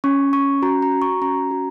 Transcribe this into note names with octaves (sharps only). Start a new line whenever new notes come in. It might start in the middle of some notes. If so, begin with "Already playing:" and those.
C#4 C#6
C#4 C#6
F#4 A#5
A#5
F#4
C#6
C#4 A#5
F#4